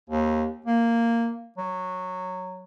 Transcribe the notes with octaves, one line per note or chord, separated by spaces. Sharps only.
D#2
A#3
F#3